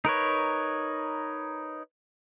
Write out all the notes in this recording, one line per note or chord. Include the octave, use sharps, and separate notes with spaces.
D#4 A#4 B4 C#5